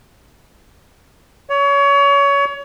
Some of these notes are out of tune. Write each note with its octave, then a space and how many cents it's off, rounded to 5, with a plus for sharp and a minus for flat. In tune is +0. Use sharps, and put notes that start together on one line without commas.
C#5 +25